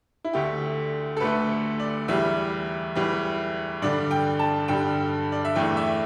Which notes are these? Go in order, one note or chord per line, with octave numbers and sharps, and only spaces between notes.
E4
D2 D3 A3 G4
A4
D2 D3 A3 B4
D5
E2 E3 G3 E5
E2 E3 G3
G2 D3 G3 D5
G5
A5
G2 D3 G3 G5
D5
E5
E2 E3 A3 G5
E5